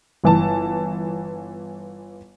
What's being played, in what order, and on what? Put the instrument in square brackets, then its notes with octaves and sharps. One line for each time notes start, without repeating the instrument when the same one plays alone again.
[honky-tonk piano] G1 E3 A5